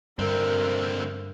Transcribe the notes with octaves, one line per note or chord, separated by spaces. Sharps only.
G2 D3 C4 A#4